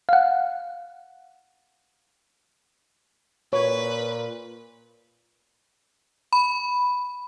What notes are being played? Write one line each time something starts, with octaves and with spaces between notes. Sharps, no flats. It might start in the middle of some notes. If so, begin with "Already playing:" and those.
F5 F#5
A#2 B4 C#5
B5